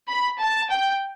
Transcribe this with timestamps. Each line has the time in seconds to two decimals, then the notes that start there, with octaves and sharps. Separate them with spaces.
0.08 B5
0.40 A5
0.71 G5